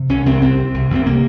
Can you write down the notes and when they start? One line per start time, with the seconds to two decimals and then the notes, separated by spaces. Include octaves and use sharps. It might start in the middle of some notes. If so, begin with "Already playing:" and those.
Already playing: C3
0.09 C2 C#4
0.26 C2 C4
0.42 C3 C4
0.58 C3
0.74 C2
0.90 C2 C4
1.06 C3 A#3